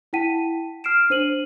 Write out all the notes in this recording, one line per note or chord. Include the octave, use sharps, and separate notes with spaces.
E4 F#5 G5 A5 B6 D#7
F6 C7 D7 E7
D4 C5 D#7 F#7